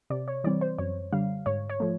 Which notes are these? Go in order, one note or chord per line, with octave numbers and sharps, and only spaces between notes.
C3 D5
C#5
E3 G3 C4 D5
C5
F#2 C#5
D3 G3 F5
G#2 C#5
C#5
F3 A3